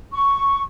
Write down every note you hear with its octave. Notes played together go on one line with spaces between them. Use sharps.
C#6